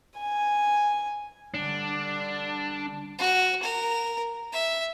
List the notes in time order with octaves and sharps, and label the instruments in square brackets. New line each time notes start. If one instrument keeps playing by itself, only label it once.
[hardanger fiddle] G#5
[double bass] D3 G3 [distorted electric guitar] D4
[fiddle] F#4
A#4
E5